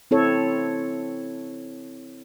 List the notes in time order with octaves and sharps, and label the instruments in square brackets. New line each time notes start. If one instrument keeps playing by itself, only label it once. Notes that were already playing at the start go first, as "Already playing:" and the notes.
[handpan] C4 E4 A4 C#5